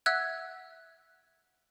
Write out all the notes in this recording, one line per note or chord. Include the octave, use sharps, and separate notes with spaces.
E5 F#5 E6 F#6 G#6